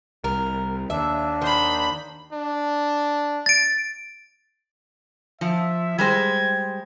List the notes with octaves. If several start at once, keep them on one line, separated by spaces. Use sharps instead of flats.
C2 A#4
D#2 D4 E5
D#3 C5 B5
D4
A6 D7
F3 E5
G3 G#3 C5 G#6